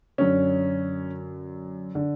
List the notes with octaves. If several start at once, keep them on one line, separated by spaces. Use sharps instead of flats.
F#2 D3 C#4
D3